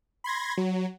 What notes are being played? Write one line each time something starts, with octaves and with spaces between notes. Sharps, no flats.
B5 C6 G#6 A#6
F#3